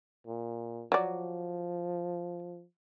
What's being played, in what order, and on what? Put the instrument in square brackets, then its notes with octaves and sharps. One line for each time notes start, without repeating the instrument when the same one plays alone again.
[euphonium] A#2
[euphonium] F3 [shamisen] F#3 D5